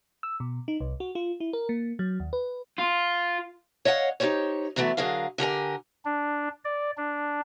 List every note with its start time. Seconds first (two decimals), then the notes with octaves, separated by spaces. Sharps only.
0.23 E6
0.40 B2
0.68 D#4
0.80 C2
1.00 F#4
1.15 F4
1.40 E4
1.53 A#4
1.69 A#3
1.99 F#3
2.20 D#2
2.33 B4
2.78 F4
3.85 C#5 D#5 F5 F#5
4.20 D#4 F4 G4 C5 C#5
4.76 A#2 E3 F#3 A3 B3
4.97 D3 F#3 G#4 A#4 F5
5.38 D3 G4 A#4 G#5
6.05 D4
6.65 D5
6.97 D4